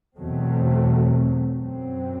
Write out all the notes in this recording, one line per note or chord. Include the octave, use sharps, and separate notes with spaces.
E2 B2 F#3 A3 C4
F#2 F#3 C4